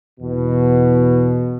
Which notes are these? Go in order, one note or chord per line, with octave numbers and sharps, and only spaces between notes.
E2 B2